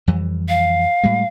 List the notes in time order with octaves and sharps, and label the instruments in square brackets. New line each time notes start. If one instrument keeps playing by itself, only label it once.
[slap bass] F2 E3 G3
[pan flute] F5
[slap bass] A2 G3 G#3